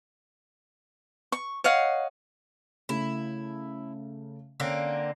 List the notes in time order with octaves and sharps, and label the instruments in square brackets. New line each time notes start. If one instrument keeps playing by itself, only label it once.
[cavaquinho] C#6
C#5 D#5 F5 F#5
[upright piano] C#3 A3 [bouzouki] E4
[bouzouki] D3 A#3 C4 [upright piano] C#4